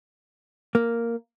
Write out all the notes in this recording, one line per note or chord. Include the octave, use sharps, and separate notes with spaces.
A#3